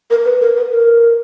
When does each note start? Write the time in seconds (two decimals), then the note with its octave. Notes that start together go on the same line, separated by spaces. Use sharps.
0.10 A#4
0.25 B4
0.41 A#4
0.57 B4
0.71 A#4